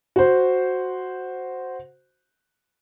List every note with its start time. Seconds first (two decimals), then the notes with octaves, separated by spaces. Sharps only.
0.16 F#4 C5